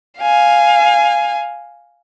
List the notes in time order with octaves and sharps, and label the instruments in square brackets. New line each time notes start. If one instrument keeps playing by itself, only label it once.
[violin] F5 G#5